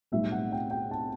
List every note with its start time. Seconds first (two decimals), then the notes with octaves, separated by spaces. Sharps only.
0.12 B1 A2 G3 E5
0.32 F#5
0.52 G5
0.70 G5
0.91 A5